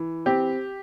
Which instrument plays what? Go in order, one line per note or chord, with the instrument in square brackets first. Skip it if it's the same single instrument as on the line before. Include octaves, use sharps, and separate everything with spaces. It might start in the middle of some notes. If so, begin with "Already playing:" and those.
Already playing: [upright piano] E3
C4 G4